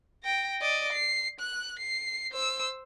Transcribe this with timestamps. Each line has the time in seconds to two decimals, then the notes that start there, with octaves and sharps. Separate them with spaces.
0.24 G5 A#6
0.61 D5 D#5
0.93 C7
1.40 F#6
1.80 C7
2.32 C5 E6